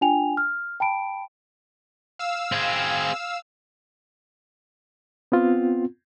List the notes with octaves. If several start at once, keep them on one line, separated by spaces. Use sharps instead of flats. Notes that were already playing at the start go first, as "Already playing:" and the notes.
D4 F4 G5 G#5 F7
F6
G5 A5 B5 D7
F5 E6
C4 G#4
B3 C4 F4